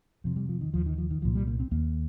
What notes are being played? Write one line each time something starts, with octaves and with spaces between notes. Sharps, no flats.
F2 C3 F3
G3
F3
D#3
D#2 F3
D#3
F3
D#3
C2 A#2 F3
G3
A#3
C4
D#2 A#3